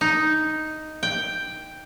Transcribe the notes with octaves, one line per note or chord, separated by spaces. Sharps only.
D#4
G5